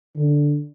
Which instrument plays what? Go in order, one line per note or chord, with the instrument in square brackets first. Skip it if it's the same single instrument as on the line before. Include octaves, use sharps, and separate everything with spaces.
[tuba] D3